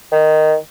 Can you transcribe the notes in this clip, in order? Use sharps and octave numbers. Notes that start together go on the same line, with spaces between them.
D#3